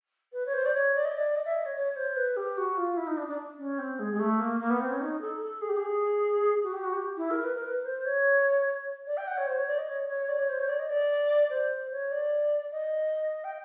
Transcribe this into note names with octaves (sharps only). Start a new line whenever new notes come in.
B4
C#5
C5
D5
C#5
D5
D#5
D5
D#5
E5
D#5
C#5
C#5
C5
B4
G4
F#4
F4
E4
D#4
D4
D4
C#4
C4
G#3
G#3
A3
A#3
A#3
B3
C4
C#4
D#4
A4
A4
G#4
G4
G#4
F#4
G4
F#4
G4
E4
A#4
B4
A#4
B4
C5
C#5
D5
G5
F#5
C#5
C5
C#5
D5
D#5
C#5
C#5
D5
C#5
C5
C#5
D5
D#5
D5
C5
C#5
D5
D#5
G5